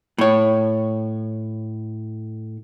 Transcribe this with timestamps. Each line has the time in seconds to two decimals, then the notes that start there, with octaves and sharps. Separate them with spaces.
0.18 A2 C#5